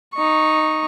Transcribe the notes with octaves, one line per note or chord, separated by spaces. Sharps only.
D#4 C#6